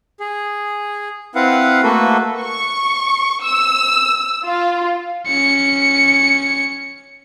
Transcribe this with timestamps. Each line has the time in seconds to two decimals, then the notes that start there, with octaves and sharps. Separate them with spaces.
0.20 G#4
1.35 C4 E4 B4 F5 F#5
1.83 A3 A#3 F#4 A4 B4
2.40 C#6
3.43 E6
4.46 F4
5.28 C#4 C#7